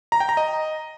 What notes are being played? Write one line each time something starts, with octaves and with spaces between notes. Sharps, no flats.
A#5
G5
A#5
D#5